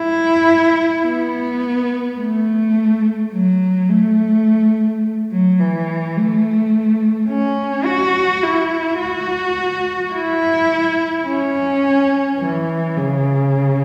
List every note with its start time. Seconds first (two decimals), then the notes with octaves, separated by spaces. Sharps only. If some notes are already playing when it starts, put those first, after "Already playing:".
Already playing: E4
1.06 B3
2.19 A3
3.33 F#3
3.90 A3
5.32 F#3
5.59 E3
6.17 A3
7.29 C#4
7.86 F#4
8.43 E4
9.00 F#4
10.13 E4
11.27 C#4
12.39 E3
12.97 C#3